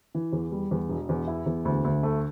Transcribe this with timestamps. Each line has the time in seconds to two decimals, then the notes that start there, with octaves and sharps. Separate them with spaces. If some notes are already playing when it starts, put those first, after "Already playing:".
0.15 E3
0.33 E2
0.52 G3
0.71 E2
0.89 E1
1.09 E2
1.28 E4
1.46 E2
1.65 D2
1.84 D2
2.03 A3